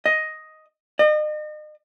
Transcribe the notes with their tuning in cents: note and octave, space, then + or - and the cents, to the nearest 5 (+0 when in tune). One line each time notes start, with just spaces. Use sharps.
D#5 +5
D#5 -40